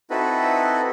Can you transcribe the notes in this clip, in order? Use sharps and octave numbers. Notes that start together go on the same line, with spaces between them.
C4 D#4 E4 F#4 A4 B4